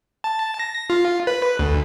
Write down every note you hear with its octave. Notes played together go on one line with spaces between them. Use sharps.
A5
A#6
F4
B4
D2